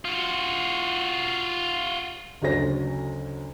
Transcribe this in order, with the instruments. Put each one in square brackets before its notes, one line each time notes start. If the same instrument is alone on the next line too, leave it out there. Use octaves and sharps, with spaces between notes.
[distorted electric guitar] F4 F#4
[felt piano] F#1 D2 C#4 F#4 C5 A#6